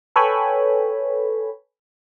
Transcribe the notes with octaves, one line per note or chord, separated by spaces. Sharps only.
A4 B4 C#5 G5 G#5 B5